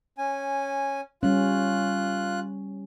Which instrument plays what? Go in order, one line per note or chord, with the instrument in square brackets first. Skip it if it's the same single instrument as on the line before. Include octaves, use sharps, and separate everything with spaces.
[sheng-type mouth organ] C#4 G#5
[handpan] G3 C#4 [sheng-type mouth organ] F4 F#6